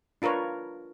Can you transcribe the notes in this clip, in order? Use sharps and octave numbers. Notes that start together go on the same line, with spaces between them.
D4 F4 A#4 B4 C#5